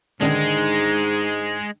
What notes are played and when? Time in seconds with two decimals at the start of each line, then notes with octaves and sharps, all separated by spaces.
0.21 G#2 D3 D#3 G#3 D4